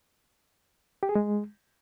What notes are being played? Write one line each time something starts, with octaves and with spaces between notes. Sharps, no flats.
G4
G#4
G#3